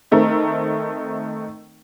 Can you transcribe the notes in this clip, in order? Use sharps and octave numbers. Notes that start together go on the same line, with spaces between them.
D#3 A3 C4 A#4